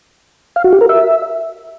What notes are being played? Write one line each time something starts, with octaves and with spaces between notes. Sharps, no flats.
F5
F#4
G4
A#4
E5